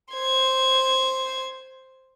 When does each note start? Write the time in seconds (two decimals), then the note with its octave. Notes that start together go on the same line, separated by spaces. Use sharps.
0.14 C5 G#6